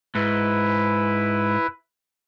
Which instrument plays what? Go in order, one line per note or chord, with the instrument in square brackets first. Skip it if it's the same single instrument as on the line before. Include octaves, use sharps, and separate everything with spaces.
[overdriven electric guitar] G#2 [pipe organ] E4 B4